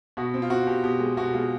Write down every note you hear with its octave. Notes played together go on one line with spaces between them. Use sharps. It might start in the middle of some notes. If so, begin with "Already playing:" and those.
B2 F#4
C4
F4
C4 F#4
B2 G4
B2 G4
G#3
B2 F#4
G#3 F4